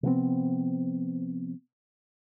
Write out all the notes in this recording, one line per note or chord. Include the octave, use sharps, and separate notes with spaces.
C3 F3 B3 C4